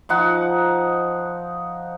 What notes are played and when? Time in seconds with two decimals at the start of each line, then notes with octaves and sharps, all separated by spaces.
0.09 F3 D#4 F#5